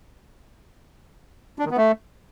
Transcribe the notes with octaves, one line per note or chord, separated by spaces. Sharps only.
D4
D#3
B3
A3